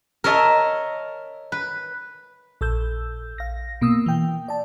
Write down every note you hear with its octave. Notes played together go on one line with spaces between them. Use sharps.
A#4 C#5 D#5 E5 A5
B4
A#1 A4 E6 G6
F5 A#6
B2 A#3 D#6 E6
E3 G5
D5 A5